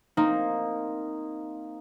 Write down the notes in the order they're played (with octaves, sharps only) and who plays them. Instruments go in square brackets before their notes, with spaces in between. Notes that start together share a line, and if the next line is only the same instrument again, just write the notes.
[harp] A#3 C4 D#4